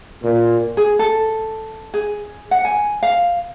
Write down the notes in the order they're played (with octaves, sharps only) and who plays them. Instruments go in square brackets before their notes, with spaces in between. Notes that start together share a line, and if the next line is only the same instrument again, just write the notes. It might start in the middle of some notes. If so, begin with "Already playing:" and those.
[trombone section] A#2
[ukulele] G#4
A4
G#4
F#5
G#5
F5